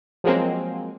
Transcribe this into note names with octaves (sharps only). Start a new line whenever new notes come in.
F3 F#3 G#3 A#3 C4